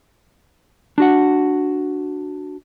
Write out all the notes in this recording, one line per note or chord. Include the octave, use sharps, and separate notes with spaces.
D4 F#4 F#5